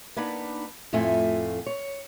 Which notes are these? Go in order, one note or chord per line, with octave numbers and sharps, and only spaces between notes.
A#3 B3 D4 D#4 B4
F2 A2 A3 F4 E5 G#5
C#5